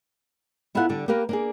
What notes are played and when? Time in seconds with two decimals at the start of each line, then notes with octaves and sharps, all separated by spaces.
0.75 B3 E4 F4 A4 F5 F#5
0.89 D3 G3 D4
1.08 A#3 G4 A#4 B4 F5
1.29 A#3 D4 G#4